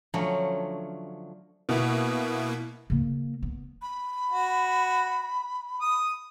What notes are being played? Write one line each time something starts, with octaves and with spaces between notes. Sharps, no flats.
D3 F3 F#3 A3 C#4
B2 A#3 B3 E4
C#3 A#3
B3
B5
F#4
D#6